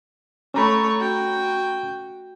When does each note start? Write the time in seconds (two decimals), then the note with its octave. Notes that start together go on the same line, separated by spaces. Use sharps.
0.54 A3 C#4 C#5 A#5 B5
0.99 F#4 G5